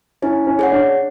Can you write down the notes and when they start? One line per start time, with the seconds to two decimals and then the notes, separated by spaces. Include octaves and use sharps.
0.22 C#4 E4
0.47 C#4
0.59 G#4 C#5 F#5
0.72 D4